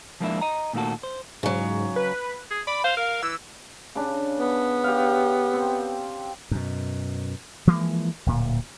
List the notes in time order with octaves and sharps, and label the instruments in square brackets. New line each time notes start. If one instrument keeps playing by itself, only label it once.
[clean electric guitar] F3 G#3 A#3 D4 E4 E5
D#5 A#5
A#2 D#3 A3 A#3 F#4 A4
C5
[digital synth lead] G#2 [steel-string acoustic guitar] C#3 F#3
[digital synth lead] B4
[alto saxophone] G#4
[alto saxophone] D5 [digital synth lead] B5
[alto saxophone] C5 [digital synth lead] F5
[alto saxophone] A#4
[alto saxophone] E3 [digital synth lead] E6
[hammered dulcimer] C#3 D4
[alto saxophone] B3
[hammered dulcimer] G4 F5
C4
[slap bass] F#2 B2
E3 F3 G#3 A#3
D1 A#2